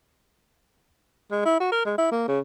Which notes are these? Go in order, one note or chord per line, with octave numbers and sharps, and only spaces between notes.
G#3
E4
F#4
A#4
G#3
E4
A#3
C#3